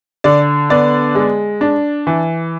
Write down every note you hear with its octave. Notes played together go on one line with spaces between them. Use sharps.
D3 D5
B3 D5
G#3
D4
E3